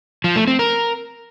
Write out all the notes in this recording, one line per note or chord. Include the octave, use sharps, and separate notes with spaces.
F3
A3
C4
A#4